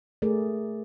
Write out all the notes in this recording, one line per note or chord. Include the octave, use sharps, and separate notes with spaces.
A3 G#4 A#4 D5